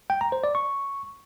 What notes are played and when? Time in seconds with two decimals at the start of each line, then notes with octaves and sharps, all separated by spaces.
0.10 G5
0.21 A#5
0.32 C5
0.44 D5
0.55 C#6